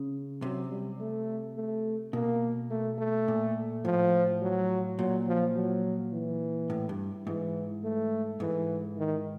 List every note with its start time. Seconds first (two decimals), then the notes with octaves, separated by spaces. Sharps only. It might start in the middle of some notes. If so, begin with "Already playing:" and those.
Already playing: C#3
0.42 C3 F#3
0.70 G3
1.00 A3
1.56 A3
2.13 B2 A#3
2.70 A3
2.99 A3
3.28 A#2
3.85 A2 F3
4.42 F#3
4.98 A#2 F#3
5.27 F3
5.55 F#3
6.12 E3
6.70 A2
6.89 G2
7.27 G#2 E3
7.84 A3
8.40 G#2 E3
8.97 D#3